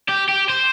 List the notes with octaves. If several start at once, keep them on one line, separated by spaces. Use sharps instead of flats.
G4
G4
C5